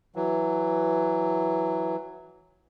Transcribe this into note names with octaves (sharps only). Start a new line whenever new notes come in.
E3 F#3